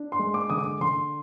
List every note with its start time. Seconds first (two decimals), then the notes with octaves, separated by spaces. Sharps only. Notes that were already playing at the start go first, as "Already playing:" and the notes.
Already playing: D4
0.12 C6
0.19 G#3
0.34 D6
0.50 D3 D#6
0.58 D6
0.80 D3 C6